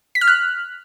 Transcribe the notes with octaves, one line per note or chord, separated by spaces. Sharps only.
B6
F6
F#6